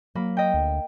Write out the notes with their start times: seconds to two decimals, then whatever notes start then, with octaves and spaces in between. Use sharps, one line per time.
0.15 F#3 A#3 B5
0.37 D#5 G5
0.54 D2